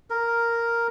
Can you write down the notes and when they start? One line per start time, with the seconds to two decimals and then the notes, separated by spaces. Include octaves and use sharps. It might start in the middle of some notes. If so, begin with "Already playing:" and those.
0.10 A#4